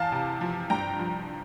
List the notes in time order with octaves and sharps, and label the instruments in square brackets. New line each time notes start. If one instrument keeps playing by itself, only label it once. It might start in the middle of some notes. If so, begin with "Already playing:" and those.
Already playing: [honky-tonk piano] E2 F5 A5
C3
F3
G2 G5 A#5
F3